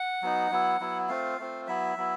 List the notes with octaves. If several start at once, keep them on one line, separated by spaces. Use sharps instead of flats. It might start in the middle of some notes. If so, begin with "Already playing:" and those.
Already playing: F#5
F#3 B3 D#4
F#3 B3 E4
F#3 B3 E4
A3 C4 F4 F5
A3 C4 F4
F#3 B3 E4 E5
F#3 B3 E4